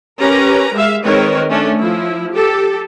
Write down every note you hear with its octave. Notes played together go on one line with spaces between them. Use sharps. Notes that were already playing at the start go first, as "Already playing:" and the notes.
C#4 G4 A#4 B4 A#5
G#3 E5 F5
D#3 G#3 C4 A#4 B4 C#5
A3 C#4 D4
F3 E4
G4 A4